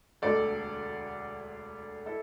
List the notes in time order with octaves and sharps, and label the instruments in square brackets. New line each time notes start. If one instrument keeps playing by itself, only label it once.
[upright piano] E1 D2 D3 A4 D5
E4 A4